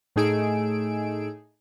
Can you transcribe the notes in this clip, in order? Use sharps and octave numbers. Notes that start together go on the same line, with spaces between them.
A2 A3 D#4 G#4 E6 D7